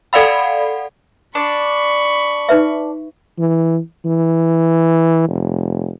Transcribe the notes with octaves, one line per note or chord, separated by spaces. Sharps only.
A4 D5 F5 F#5 B5
D4 D5 B5 C#6
D#4 B4 E5
E3
E3
F1